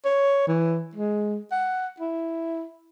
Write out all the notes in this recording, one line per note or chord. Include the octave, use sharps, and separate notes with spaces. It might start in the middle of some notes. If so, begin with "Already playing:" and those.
C#5
E3
G#3
F#5
E4